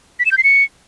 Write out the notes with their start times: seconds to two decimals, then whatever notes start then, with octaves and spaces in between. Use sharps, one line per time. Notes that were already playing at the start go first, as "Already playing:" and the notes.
0.20 B6
0.26 E7
0.32 G6
0.38 C7
0.44 C#7